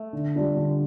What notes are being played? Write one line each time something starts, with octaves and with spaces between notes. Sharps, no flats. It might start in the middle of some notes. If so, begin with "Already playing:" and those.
Already playing: A3
D3
G3 D4 F4
D3